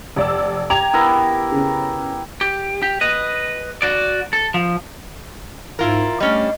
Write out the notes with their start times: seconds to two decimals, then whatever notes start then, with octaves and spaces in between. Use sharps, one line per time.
0.16 F1 D5 E6
0.70 G4 A#5 G#6 F7
0.93 B3 E4 A#4
1.52 C#3 C#4
2.41 G4
2.82 G4
3.01 B4 D#5
3.82 F#4 D5
4.33 A4
4.54 F3
5.79 G#2 E4 F4 A#4
6.20 G3 A3 C#4 D4 D#5